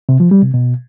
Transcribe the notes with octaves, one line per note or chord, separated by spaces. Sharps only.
C3
F3
G3
C3
B2